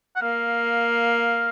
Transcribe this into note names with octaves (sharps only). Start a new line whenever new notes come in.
F#5
A#3 F5